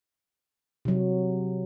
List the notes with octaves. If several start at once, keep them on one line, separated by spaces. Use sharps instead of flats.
C3 F#3